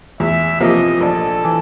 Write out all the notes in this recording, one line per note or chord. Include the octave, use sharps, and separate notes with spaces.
E2 E5
C3 F3 A#3 D#5
A#1 A4
E3